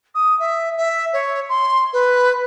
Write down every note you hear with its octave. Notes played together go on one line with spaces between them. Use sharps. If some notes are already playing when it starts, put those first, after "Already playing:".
D#6
E5
E5
C#5
C6
B4